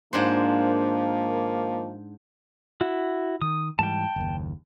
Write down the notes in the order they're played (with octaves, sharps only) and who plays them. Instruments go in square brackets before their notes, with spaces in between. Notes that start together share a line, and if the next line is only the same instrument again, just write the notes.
[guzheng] G#2 D4 C5 [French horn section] D#3 F3 A#3
[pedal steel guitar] E4 F#4
[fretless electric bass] D#3 [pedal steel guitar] D#6
[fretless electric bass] G#2 E3 G3 [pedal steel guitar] G5 A5
[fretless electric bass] F#1 D#2